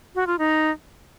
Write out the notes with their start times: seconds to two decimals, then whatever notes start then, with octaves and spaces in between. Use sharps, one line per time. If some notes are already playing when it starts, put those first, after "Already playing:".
0.15 F#4
0.27 F4
0.39 D#4